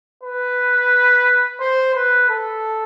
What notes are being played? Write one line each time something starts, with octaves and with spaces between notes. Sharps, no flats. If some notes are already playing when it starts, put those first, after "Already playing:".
B4
C5
B4
A4